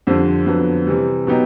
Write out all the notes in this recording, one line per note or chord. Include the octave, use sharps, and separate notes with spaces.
F2 D3 G3 C4
F2 D3 F#3 B3
C3 E3 G3
B2 F#3 B3 D#4 G4